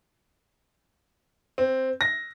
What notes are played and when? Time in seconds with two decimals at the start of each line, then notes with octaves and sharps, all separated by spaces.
1.58 C4
2.01 A#6